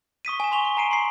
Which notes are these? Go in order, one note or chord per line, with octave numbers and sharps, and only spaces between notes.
C#6 D#6 B6 D#7
G#5 E7
C6 C#6 F7 G7
C#6
G#5 A#5 C#6 C7 D7 D#7
C6 C7